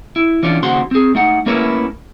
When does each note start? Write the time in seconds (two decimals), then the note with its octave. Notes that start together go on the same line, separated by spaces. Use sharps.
0.16 E4
0.43 E3 C#4 D4 F4 D5
0.63 D#2 C#3 F#4 C5 F#5 C6
0.91 C4 G#4
1.15 A3 D#4 F#5
1.46 A3 A#3 C#4 E4 A#4 B4